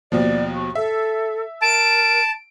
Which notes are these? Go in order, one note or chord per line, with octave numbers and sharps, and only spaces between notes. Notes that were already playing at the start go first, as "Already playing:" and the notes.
D#2 B2 F3 D5
C#6
A4 E5
A#4 A5 D7